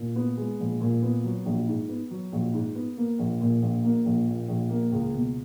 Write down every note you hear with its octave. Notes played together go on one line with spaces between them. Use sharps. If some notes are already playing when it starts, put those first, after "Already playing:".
Already playing: A#2
B3
G#3
A#1
A#2
B3
F#3
A#1
G#2
B3
F#3
A#1
G#2
B3
A#3
A#1
A#2
A#1
A#3
A#1
A#2
A#1
A#3
C#2
B2